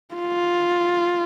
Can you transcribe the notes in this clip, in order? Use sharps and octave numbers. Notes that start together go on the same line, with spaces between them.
F4